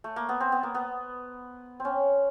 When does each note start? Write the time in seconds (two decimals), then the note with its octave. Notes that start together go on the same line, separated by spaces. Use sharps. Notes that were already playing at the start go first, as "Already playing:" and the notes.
0.04 A3
0.16 A#3
0.29 B3
0.40 C4
0.52 B3
0.63 A#3
0.75 B3
1.80 C4
1.85 C#4